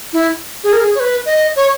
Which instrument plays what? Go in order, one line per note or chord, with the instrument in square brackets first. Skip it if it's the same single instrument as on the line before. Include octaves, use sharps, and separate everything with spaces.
[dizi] E4
G#4
A#4
G#4
C#5
B4
D#5
C#5